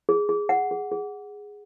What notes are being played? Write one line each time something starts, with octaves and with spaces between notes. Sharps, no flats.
G#4
G#4
F#5
G#4
G#4